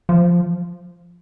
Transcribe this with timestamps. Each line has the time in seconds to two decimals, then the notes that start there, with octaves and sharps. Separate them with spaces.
0.09 F3